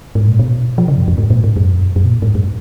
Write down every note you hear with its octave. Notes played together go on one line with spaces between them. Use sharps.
G#2
A#2
B2
F3
C#3
F#2
F2
G#2
A#2
G#2
F#2
F2
F#2
F#2
B2
A#2
G#2
F#2